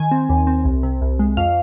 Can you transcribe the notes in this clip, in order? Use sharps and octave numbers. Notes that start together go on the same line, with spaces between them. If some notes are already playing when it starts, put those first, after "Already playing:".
Already playing: D#3 G#5
C4
D#2
C4
C2
C3
C2
G#3
F2 F5